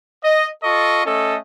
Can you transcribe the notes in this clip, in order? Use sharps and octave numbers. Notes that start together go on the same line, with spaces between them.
D#5
F4 A4 D#5 C#6
A3 C#4 A4 D#5